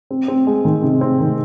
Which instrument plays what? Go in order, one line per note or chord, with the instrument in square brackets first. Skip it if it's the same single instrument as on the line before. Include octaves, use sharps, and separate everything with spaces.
[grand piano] C4
C4
G#3
D#3
C3
C4
D#3